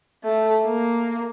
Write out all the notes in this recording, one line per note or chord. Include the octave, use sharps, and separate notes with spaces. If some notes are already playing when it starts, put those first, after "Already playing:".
A3
A#3